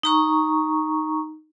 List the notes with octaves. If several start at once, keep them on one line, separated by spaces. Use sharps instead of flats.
D#4 A#5 C#6